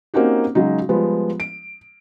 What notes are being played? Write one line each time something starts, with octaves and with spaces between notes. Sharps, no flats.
A#3 C4 C#4 D#4 F#4 G4
C#3 F#3 G#3 D#4
F3 G3 G#3 B3
D7